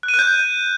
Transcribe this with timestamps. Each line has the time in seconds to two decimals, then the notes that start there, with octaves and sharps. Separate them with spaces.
0.03 F#6
0.08 D#7
0.14 F#6
0.19 G6